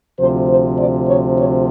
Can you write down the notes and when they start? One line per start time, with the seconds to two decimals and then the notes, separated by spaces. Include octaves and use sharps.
0.19 D2 C3 F3 C5
0.49 C5
0.78 D5
1.08 C#5
1.38 C#5